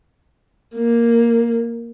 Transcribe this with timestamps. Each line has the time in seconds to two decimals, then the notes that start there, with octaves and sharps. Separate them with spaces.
0.75 A#3